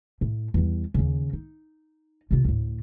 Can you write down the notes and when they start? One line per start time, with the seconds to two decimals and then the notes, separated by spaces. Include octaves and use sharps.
0.21 A2
0.54 E2 G3
0.94 D#2 C#3
1.33 D#4
2.31 C3 F4
2.45 D2 A2